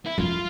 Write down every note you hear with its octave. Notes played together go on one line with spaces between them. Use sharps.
E4
F3 F4